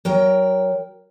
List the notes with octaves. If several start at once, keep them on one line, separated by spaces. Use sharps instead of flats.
F#3 A#4 G5